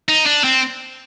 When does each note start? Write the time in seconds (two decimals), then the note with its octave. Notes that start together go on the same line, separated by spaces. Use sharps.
0.08 D#4
0.26 D4
0.44 C4